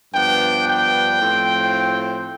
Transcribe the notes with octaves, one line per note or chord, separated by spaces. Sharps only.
G2 F3 B3 D4 G5
G5
A2 F3 C4